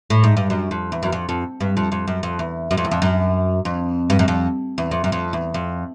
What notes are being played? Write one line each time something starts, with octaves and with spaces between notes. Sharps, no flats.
A2
G#2
G2
F#2
F2
E2
F#2
F2
F2
G2
F2
F2
F#2
F2
E2
F#2
F2
E2
F2
F#2
F2
G2
F#2
F2
E2
F2
F#2
F2
E2
F2